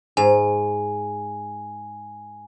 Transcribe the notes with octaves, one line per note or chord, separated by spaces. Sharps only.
G#2 G#5